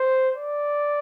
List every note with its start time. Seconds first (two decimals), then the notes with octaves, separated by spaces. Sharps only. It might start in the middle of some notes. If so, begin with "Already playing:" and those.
Already playing: C5
0.36 D5